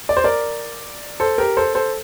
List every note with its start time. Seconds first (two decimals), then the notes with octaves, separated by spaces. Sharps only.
0.09 D5
0.17 C5
0.24 A#4 D5
1.20 A4 C5
1.38 G4 A#4
1.57 A4 C5
1.75 A4 C5